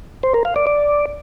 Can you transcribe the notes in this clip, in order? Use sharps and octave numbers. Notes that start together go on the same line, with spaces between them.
C5
A#4
F5
D5
D5